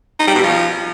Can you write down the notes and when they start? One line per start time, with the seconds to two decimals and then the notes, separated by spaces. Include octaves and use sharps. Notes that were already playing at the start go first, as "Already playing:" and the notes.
0.19 D#4
0.27 G3
0.35 B2
0.43 F3